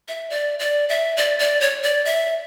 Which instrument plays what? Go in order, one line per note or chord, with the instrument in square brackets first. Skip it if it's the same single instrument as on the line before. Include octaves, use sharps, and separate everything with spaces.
[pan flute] E5
D5
D5
E5
D5
D5
C#5
D5
E5